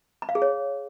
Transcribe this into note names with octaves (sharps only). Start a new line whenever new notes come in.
B5
F5
G#4
C#5